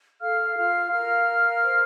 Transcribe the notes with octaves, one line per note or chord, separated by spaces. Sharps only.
A4 F5 F6
F4 F5 F6
A#4 F5 F6
A#4
C5